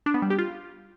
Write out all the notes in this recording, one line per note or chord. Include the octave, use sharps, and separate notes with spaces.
D4
B3
G3
G4
F4